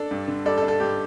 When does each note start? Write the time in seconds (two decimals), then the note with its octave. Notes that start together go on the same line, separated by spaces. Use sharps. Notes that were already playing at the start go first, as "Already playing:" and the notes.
Already playing: D4 A4 D5
0.11 G2
0.28 D3
0.45 G3 A4 D5
0.58 A4
0.62 D4
0.68 A4
0.80 G2 G4